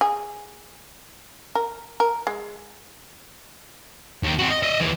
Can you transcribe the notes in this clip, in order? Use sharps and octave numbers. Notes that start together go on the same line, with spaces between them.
G#4
A#4
A#4
G#3
D#2
C4 F#4
D#5
D#5 E5
D#2 E3